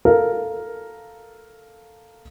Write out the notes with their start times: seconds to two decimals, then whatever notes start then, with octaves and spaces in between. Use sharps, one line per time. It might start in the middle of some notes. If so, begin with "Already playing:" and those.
0.05 A4 A#4 F5